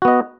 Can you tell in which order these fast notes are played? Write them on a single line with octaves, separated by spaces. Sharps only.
F#4 B3 D#5